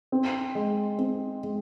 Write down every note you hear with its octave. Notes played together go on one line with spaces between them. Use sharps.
C4
G#3
C4
G#3